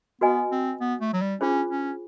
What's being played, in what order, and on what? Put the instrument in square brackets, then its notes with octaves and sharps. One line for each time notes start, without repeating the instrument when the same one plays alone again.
[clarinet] B3 [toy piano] F#4 B4 D#5 G#5
[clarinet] C4
B3
A3
F#3
G3
[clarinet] C#4 [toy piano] D4 F4 G#4 C5
[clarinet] C#4